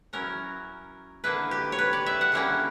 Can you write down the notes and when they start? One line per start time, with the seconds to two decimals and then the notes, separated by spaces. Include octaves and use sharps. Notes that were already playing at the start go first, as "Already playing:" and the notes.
0.13 F#3 C#4 E4 A#4
1.24 D3 A#3 E4 B4
1.51 G4
1.72 C#5
1.79 B4
1.93 D5
2.06 E5
2.21 F#5
2.32 D3 G3 A#3 C#4 E4 G5